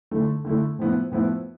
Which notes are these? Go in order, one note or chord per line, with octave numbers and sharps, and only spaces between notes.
D3 A3 E4
D3 A3 E4
A2 F3 B3 E4
A2 F3 B3 E4